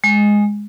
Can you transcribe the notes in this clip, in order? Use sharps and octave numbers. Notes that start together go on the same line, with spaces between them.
G#3